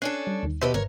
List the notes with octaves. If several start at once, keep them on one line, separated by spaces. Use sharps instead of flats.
C#4 D4 A4 F#6 C7
G3
D#2 D#3
B2 G4 B4 C5 E5
G#1 A#4 B4 C#5